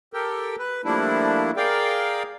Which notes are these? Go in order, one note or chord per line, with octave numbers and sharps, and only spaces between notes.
G4 A4 A#4 G5
B4
F3 G3 A3 A#3 D4 E4
G#4 A#4 D5 F5 G5